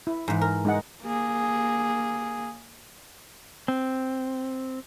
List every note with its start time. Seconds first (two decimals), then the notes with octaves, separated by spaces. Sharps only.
0.07 E4
0.28 G#2 E3
0.41 A#4
0.65 G#3 D#4 F#5
1.02 A#3 G#4
3.68 C4